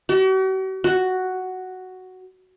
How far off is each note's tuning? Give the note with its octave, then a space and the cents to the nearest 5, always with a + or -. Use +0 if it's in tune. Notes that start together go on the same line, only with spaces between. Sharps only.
F#4 +45
F#4 +5